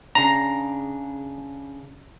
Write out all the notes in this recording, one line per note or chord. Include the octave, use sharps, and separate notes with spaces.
C#3 D4 A#5